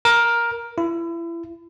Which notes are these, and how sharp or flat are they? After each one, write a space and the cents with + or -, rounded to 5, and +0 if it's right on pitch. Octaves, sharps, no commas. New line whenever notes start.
A#4 +10
E4 +30